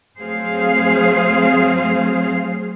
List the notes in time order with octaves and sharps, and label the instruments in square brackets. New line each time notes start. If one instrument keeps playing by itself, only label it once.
[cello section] F#3 A3 C4 G#4 C5 F5